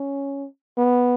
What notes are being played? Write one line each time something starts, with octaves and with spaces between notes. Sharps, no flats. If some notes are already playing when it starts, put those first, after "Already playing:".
Already playing: C#4
B3